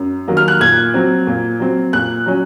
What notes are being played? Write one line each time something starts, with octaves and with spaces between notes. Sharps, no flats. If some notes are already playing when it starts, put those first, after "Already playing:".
Already playing: F#2
D#3 F#3 A#3
F6
F#6
A#2 G#6
F#3 C4
A#2
F#3 C4
A#2 F#6
F#3 C#4